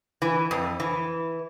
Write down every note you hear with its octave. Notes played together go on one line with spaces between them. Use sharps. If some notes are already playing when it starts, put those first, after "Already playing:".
E3
F2
E3